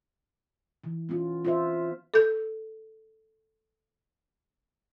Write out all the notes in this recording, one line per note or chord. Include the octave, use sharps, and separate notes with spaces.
E3
B3 C#4 F4
F4 C5 E5
A4 G6